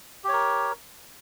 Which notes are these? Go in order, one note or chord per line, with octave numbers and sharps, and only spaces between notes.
G4 A#4 C#5